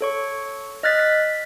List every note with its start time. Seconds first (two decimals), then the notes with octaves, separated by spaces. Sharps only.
0.01 A4 C#5 C#6
0.83 D#5 F6 F#6 A6 B6
1.00 B6